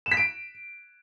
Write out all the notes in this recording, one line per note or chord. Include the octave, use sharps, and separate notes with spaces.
E7
B6
D7